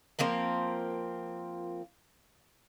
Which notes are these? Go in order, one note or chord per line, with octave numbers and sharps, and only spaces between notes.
F3 A#3 C4 A#4